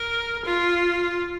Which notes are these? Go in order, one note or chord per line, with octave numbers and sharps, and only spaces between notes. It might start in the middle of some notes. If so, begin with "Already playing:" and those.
Already playing: A#4
F4